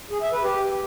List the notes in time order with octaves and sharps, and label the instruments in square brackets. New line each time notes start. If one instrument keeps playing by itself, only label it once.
[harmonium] G#4
E5
B4
G4